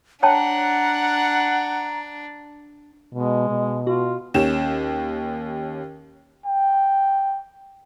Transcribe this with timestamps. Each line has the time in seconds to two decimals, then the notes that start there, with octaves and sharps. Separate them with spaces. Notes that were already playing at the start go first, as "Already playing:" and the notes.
0.23 D4 C#5 F#5 G5 A5 A#5
3.14 B2 G#3
3.49 B2
3.87 F4 F#4
4.34 D#2 C#4 G4 E7
6.46 G5